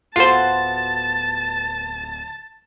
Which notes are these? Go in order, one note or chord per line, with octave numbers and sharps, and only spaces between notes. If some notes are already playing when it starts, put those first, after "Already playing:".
D1 B3 F4 F#4 A4 C5 A5